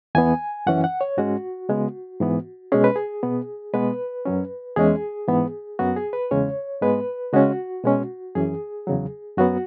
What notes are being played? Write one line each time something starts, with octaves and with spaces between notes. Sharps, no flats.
E2 E3 B3 G#5
F#2 E3 C#4 F#5
F#5
C#5
G#2 G#3 C#4 F#4
C#3 G#3 B3
G#2 E3 B3
B2 G#3 C#4 G#4
B4
G#4
B2 B3
B2 G#3 B3 B4
F#2 F#3 C#4
E2 E3 G#3 C#4 G#4
G#2 E3 B3
F#2 F#3 B3 F#4
G#4
B4
E2 C#3 G#3 C#4 C#5
G#2 G#3 B3 B4
C#3 G#3 C#4 F#4
B2 G#3 C#4
F#2 E3 C#4 G#4
E2 C#3 F#3
F#2 F#3 B3 F#4